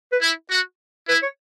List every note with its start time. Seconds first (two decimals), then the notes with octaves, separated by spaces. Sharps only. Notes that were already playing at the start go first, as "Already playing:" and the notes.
0.12 B4
0.21 E4
0.51 F#4
1.08 E4 B4
1.22 C#5